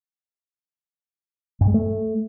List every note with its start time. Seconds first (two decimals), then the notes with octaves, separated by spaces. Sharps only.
1.61 G2
1.68 G#3
1.74 A3